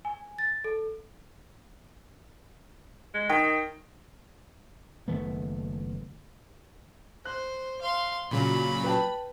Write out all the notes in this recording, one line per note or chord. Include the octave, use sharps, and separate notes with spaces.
G#5
A6
A4
G#3
D#3 G5
F#1 D#3 A3 B3
C5 F#6
F5 C6
A#2 C#3 F#3 B5
B4 G5 A5